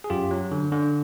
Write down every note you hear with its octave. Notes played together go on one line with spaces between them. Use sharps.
G#4
F#2 F4 G4
F#3
D3
D3